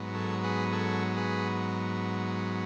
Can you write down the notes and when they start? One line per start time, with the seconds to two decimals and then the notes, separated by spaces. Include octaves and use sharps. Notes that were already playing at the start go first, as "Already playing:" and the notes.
Already playing: G#2 F#3 B3
0.15 A4 C#5
0.44 G#4 B4
0.73 A4 C#5
1.17 G#4 B4